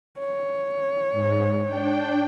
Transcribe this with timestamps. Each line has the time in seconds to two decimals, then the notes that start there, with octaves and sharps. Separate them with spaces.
0.19 C#5
1.12 G#2
1.65 D4 G5